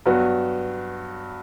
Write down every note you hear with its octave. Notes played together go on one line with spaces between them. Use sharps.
G2 F#3 B3 F#4